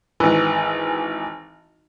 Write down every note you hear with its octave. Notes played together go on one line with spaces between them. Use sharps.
G#1 E3